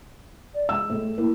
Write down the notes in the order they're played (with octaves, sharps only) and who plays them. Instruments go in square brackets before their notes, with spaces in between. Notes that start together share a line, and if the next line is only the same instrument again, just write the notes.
[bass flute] D5
[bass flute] G#3 [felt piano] E6
[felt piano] A2
[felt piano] A#3 [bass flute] E4